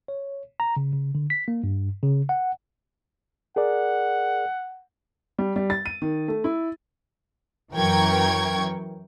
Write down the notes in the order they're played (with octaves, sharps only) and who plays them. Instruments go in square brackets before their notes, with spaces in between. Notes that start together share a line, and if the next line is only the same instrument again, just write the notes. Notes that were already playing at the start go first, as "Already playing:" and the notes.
[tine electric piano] C#5
A#5
C#3
C#3
D3
B6
A#3
G2
C#3
F#5
[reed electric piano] G#4 A#4 D5 [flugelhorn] F#5
[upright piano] G3
G3
A6
D#7
D#3
A3
E4
[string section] F#2 E3 A#4 G5 C#6 G#6